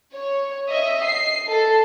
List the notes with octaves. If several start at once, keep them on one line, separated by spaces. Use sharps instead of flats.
C#5
D#5 E5
C7
A4